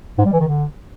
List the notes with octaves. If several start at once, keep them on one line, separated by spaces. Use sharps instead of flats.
G#2
G3
E3
D#3
D3